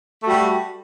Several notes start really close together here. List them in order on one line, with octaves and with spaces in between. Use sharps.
A3 F#4 G3